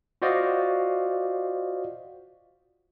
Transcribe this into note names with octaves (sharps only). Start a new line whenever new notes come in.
F4 F#4 C5 D5 D#5 F5